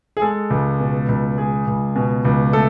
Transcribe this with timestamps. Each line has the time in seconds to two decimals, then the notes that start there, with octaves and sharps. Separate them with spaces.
0.17 G#4
0.22 G#3 A4
0.50 C#2
0.80 B2
1.08 C#2
1.37 G#3 G#4
1.67 C#2
1.96 B2
2.25 C#2
2.53 A3 A4